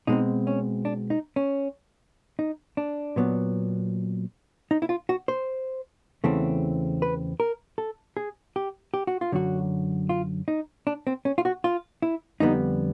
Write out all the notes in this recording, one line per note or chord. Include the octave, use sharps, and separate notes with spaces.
B2 G#3 C4 D#4
C#4
D4
D#4
C#4
D#4
D4
A#2 F#3 B3
D#4
E4
F4
F#4
C5
E2 C#3 E3 A3 C4
B4
A#4
A4
G#4
G4
G4
F#4
F4
F#2 D3 F#3 F#4
F4
D#4
D4
C4
C#4
F4
F#4
F4
E4
F2 D3 G3 B3 D#4